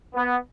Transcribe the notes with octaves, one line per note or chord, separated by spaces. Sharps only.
B3